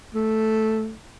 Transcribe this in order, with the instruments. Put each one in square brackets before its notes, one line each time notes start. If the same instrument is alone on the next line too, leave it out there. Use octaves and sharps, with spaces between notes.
[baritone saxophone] A3